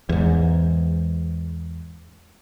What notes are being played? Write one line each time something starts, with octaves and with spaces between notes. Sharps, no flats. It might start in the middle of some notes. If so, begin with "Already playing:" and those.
E2 G#2